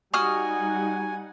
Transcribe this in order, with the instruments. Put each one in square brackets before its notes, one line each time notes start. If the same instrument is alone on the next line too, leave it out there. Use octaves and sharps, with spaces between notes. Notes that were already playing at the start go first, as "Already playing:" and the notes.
[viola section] G3 D#4 F#5 [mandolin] F#4 D#6 F6 [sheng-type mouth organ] G#5